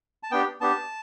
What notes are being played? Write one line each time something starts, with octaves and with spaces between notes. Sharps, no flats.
A5
B3 D4 G4 G5
B3 D4 G4 A5